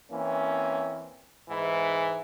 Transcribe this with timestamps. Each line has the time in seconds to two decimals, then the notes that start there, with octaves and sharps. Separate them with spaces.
0.12 E3 A#3 C4 C#4
1.50 G#2 E3